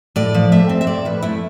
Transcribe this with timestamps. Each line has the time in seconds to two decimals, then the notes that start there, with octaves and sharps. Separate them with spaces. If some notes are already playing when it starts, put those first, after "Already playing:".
0.16 A2 D5
0.34 F3
0.52 A3 E5
0.69 C4
0.81 E5
0.87 A2 D5
1.05 F3 B4
1.23 A3 E4